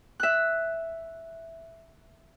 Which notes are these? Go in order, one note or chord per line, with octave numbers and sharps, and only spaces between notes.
E5 F#6